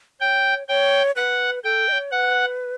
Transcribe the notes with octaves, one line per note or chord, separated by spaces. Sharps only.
C#5 G5
C#5 G5
B4 F#5
A4 G5
D#5
C#5
B4 F#5